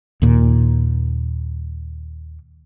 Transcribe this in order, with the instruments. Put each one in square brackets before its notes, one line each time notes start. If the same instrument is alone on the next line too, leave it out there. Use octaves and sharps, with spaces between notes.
[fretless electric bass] D#2 A#2